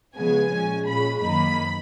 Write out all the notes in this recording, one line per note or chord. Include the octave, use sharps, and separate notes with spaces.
C#3 F3 G#3 B3 G#5
A#2 G#3 C#4
A#2 G#3 C#4 B5
F#2 D#3 A#3 D#4 B5